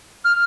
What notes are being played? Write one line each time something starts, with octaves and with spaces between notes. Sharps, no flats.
F6